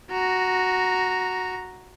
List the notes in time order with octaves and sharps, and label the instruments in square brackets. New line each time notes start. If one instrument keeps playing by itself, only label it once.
[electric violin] F#4 A#5